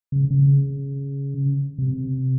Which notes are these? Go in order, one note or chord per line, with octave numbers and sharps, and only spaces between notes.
C#3
C#3
C3